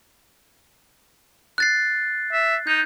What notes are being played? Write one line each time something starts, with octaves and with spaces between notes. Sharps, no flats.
F#6 A6 C7
E5
D#4 G6